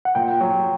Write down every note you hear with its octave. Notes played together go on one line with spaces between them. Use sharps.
F#5
A#2 G5
F#3